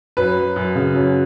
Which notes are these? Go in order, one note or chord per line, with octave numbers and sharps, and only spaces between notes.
F#2 B4
F#3
F#2
C#3
F#2